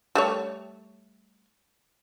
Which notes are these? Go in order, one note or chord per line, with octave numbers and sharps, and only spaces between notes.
G3 A3 C#5